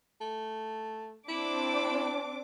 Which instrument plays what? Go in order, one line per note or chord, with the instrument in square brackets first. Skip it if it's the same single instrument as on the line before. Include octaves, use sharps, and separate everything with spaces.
[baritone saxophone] A3
[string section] C4 D4 D6 [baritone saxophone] E4